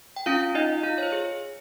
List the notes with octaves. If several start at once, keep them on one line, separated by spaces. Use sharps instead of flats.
G5
C#4 F4 F5
D#4 F4 D#5
F4 F5
C#5
C5
G#4